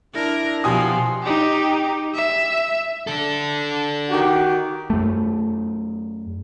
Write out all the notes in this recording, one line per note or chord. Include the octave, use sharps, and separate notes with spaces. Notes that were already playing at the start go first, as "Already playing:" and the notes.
D4 E4 A#4 A#6
B2 F3 G4 G#5 C6 D#6
D#4 G4
E5
D4 A4
D#3 F#4 G4
F#2 A3